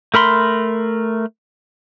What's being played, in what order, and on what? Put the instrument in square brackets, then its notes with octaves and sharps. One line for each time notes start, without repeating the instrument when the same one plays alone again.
[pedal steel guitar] A3 A#4 B5 C6